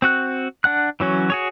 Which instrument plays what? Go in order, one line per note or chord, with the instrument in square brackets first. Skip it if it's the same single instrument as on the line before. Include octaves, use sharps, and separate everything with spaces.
[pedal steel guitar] C4 F#4 F#6
D4 F#5 F#6
E3 F#3 C#4 F#4
F#4 G#4 C#5